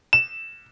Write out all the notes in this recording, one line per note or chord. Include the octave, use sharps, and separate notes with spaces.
E7